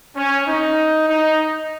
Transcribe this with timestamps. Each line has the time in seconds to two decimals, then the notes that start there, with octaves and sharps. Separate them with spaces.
0.16 C#4
0.46 D#4
1.08 D#4